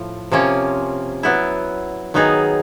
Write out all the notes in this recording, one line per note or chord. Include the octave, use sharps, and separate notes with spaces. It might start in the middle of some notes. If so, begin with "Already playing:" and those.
Already playing: A2 F3
C3 F3 A#3 C#4
F#3 B3 E4
D#3 F#3 B3 D#4 G#4